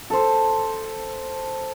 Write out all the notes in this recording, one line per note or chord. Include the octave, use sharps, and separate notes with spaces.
A4 C5